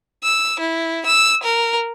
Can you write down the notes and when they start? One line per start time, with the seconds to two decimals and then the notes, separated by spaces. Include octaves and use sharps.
0.23 E6
0.60 E4
1.06 E6
1.43 A#4